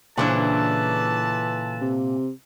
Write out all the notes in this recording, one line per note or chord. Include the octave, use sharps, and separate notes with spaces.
A#2 C#3 E3 D4 A4 B4 A5
C3